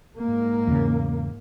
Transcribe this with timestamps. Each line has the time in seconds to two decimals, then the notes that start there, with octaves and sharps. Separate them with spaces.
0.18 G#2 A#3
0.67 E2 C#3